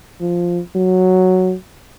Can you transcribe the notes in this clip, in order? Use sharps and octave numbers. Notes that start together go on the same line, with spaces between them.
F3
F#3